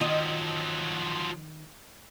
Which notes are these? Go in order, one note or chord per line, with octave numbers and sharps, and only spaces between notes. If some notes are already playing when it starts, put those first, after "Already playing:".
D#3 F3 F#3 D#5